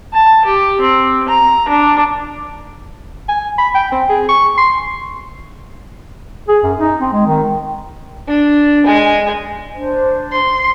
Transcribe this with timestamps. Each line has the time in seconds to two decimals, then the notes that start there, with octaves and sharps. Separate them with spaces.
0.13 A5
0.45 G4
0.80 C4
1.28 A#5
1.68 D4
3.28 G#5
3.58 B5
3.74 G5
3.92 C4
4.09 G#4
4.29 C#6
4.58 C6
6.49 G#4
6.63 F#2
6.78 D#4
7.01 C4
7.13 G#3
7.27 D#3
8.27 D4
8.86 G#3 G#5
9.75 D4 C5
10.32 C6